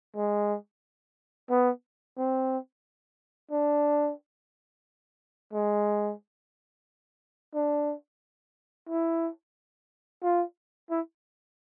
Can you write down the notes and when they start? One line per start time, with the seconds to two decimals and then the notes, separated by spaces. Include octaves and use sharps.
0.16 G#3
1.50 B3
2.18 C4
3.52 D4
5.53 G#3
7.54 D4
8.89 E4
10.23 F4
10.90 E4